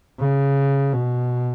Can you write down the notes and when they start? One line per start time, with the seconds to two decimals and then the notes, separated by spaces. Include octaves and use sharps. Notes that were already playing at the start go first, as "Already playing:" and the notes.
0.20 C#3
0.94 B2